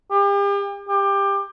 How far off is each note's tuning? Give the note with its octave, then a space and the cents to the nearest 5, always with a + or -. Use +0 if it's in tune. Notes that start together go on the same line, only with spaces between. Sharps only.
G4 +40
G4 +20